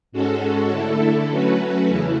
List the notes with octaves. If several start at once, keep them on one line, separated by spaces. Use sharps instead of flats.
G#2 G#3 C#4 F#4 A4
D3 A3 E4 A4
F#3 A3 C#4 F#4 B4
E2 C#3 E3 A3 E4